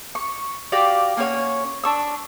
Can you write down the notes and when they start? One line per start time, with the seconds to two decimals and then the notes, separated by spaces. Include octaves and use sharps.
0.15 C#6
0.72 F#4 G4 D5 F5
1.17 A#3 C#4 C#5 F#5
1.84 D4 C#6 E6